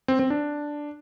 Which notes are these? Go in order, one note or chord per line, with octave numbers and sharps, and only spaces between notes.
C4
C4
D4